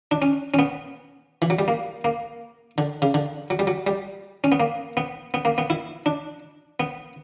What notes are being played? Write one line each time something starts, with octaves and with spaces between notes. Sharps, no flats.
D4
C#4
C#4
B3
E3
F#3
G3
A#3
A#3
D3
C#3
D3
F#3
G3
F#3
G3
C#4
B3
A#3
B3
B3
A#3
B3
E4
D4
B3